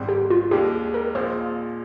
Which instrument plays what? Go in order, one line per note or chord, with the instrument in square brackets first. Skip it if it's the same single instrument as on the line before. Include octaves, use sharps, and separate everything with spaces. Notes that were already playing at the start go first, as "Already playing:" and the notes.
Already playing: [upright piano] G#1 G#2 G3 C4
[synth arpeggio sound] G4
F4
[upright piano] D#2 D#3 G#3 D4 [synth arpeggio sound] G4
[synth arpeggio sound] A#4
[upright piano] A#1 A#2 G#3 C4 F4 [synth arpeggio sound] C5